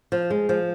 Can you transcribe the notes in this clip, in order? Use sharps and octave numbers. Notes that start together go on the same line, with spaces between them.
F3
G#3
F3